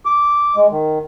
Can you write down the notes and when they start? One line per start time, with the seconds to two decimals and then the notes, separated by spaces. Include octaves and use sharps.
0.05 D6
0.56 G#3
0.72 D#3